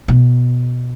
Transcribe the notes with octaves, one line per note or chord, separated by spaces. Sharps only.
B2